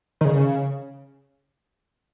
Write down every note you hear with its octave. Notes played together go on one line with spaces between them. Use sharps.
D#3
C#3